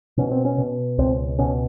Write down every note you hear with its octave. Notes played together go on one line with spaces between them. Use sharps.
B2 C#4
C4
C#4
B2
C#2 C4
B2 C#4